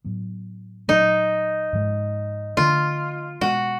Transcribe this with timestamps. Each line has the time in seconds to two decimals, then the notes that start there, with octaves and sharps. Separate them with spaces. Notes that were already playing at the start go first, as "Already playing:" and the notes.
0.04 A2 F#3 B3
0.88 A#2 F#3 A3 D#4
1.73 G#2 F3 G#3
2.57 D3 F3 A3 D4 F4
3.41 B2 G#3 B3 F#4